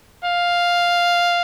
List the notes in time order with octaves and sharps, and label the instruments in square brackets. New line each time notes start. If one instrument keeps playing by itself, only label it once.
[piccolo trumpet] F5